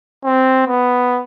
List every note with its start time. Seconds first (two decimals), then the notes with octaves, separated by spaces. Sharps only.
0.24 C4
0.67 B3